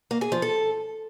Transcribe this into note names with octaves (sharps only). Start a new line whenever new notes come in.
A#3
G#4
F3
A4